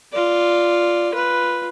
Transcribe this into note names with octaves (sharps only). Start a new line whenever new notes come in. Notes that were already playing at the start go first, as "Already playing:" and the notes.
F4 D5
F4 B4